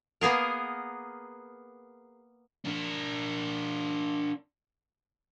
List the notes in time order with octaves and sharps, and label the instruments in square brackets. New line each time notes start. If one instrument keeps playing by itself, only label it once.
[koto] A#3 B3 G#4 A#4
[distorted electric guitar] D4 A#4